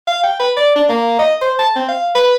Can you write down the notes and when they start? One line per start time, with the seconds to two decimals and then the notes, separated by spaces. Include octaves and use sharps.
0.07 F5
0.23 G5
0.39 B4
0.57 D5
0.76 D4
0.89 A#3
1.19 D#5
1.41 C5
1.59 A5
1.76 C4
1.88 F5
2.15 B4